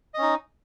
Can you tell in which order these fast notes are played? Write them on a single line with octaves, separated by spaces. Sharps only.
D#5 C#4 D#4